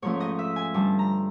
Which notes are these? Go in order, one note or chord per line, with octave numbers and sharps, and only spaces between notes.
G#2 F3 A3 C#4 C#5
D#5
E5
G#5
G2 D3 G3 A5
A#5